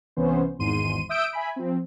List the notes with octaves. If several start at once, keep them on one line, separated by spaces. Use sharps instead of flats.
C2 E3 B3 C#4 C5
G#1 E2 G#2 C6 D#7
E5 D#6 E6 G6 D7
E5 G#5 B5
F3 C4